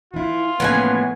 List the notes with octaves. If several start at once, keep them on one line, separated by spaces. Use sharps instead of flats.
E3 E4 F4
A2 E3 F3 A#3 B3 C#4 G#5